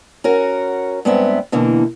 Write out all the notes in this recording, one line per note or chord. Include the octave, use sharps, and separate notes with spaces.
C#4 F#4 A#4
G2 G#3 B3 C4 E5
B2 D3 E3 A#3